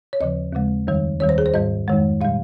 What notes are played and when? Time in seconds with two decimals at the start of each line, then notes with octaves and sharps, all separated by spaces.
0.13 C#5
0.21 D#2 C#3 F3 D#5
0.53 D#2 C#3 G#3
0.87 F2 D#3 G3
1.20 D#2 D#3 G3 C#5
1.29 C5
1.38 G#4
1.46 C5
1.54 G#2 G3 D#5
1.88 F2 D#3 G#3
2.21 A#2 G3 F5